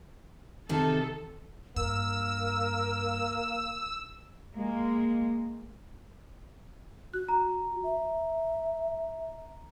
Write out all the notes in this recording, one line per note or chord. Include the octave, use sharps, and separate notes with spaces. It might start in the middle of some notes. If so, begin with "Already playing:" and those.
C3 D#3 D#4 A4
G2 A#3 A#4 E6
G#3 A#3
F#4 F#6
A#5
E5